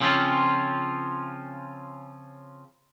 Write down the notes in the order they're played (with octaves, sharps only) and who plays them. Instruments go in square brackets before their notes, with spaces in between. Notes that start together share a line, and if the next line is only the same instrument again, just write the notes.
[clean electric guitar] C#3 F3 C4 C#4 F4